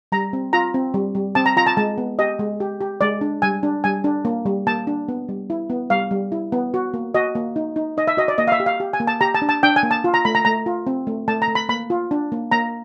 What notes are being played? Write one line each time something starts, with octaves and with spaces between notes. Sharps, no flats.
G3 A#5
C4
F4 A#5
C4
G3
G3
C4 A5
A#5
F4 A#5
A5
G#3 A5
B3
G4 D#5
G#3
G4
G4
G#3 D5
D4
G3 G#5
D4
G3 G#5
D4
A#3
G3
A#3 A5
D4
B3
G3
E4
B3
G3 F5
G3
E4
B3
F#4
A#3
F#4 D#5
A#3
D#4
D#4
D#4 D#5
E5
F#4 D#5
D5
A#3 D#5
F5
E5
G4
F5
G4
G#5
A#3
A5
G4 A#5
A5
D4
A5
D4 G5
G#5
A#3
A5
F4
A#5
A3 B5
A#5
A3 A#5
F4
C4
A3
A3 A5
A#5
A3
B5
A#3 B5
F4
D4
A#3
A#3 A#5